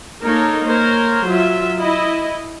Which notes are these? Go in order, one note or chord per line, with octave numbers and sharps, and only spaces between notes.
A#3 D#4 A4 A#4 C#5
A#3 A#4 C5 C#5
F#3 F4 E5
E4 D#5